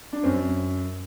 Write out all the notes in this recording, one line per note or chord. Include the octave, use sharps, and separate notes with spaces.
D4
F#2 C4